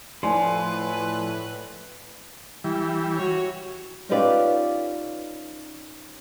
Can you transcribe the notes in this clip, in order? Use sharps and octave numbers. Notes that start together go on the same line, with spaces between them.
A2 F3 B4 D5 G#5 C6
E3 G3
F#4 C#5
C#4 D#4 F4 G4 B4 D5